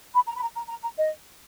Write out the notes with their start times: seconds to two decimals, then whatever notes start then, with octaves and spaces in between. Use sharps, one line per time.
0.14 B5
0.28 A#5
0.36 B5
0.41 A#5
0.56 A#5
0.69 A#5
0.83 A#5
0.97 D#5